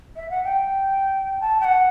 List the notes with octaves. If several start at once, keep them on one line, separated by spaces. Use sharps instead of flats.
E5
F#5
G5
A5
G5
F#5